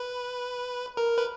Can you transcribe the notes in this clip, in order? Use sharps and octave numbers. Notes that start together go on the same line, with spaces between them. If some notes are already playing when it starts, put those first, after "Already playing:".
Already playing: B4
A#4
B4